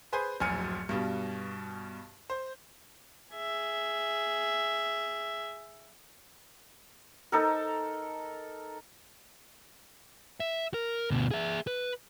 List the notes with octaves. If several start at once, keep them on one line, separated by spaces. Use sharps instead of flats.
G#4 B4 C5 G#5 G6
D1 A#1 F#2 G#5 F6 C#7
G2 B2 G3
C5
G#4 E5
D#4 A4 A#4
E5
A#4
D2 B2
G#4 E5
B4